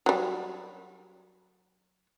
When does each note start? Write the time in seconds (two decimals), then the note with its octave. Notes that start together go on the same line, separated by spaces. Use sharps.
0.06 F#3 G3